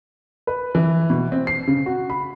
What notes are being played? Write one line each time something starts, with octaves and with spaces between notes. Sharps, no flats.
B4
E3
B2
C4
C7
C#3
F#4
B5